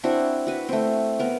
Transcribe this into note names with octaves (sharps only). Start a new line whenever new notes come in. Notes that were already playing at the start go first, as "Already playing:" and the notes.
C4 D4 E4 F#4
F#4 B4
A3 C4
B3 A#4